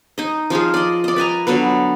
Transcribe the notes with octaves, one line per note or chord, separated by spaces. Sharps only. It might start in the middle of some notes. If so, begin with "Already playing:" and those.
D#4 D#5
F3 D#4 F4 G#4
D5 D#5
D5 D#5
B4 D#5 G#5 A#5
D3 F#3 B3 B4